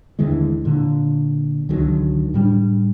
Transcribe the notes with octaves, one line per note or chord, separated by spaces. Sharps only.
D#2 D3 E3 G#3
A#2 D3
C#2 D3 D#3 F#3
A2 G3 D4